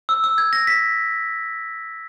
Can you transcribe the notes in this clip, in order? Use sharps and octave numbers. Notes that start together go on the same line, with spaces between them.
E6
E6
G#6
A#6
B6